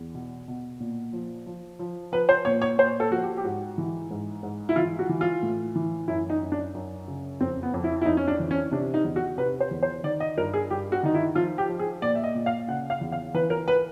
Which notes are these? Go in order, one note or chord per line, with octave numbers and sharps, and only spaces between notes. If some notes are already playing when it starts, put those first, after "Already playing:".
Already playing: E2
B2
B2
A#2
F3
F3
F3
F3 B4
C5
A#2 C#5
C#5
A#2 C5
A4
F3 F#4
G4
G4
G#2 F#4
E3
G#2
G#2
E4
E3 F4
F#4
E3
F4
A2
E3
F#2 E4
D#4
F#2
D4
F#2
C#3
F2 C4
B3
F2
E4
E4
F2 D#4
C#4
D4
E3
C#4
C3 D4
D#4
E2
F#4
C3 B4
C5
E2
C5
D#3 D5
D#5
G2 A#4
G#4
G2 G4
F#4
D#3 D#4
E4
F3 F4
G4
F3
G#4
A#2 D5
E5
D#5
A#2
F5
C#3 F#5
F5
E2
F5
E3 B4
A#4
B4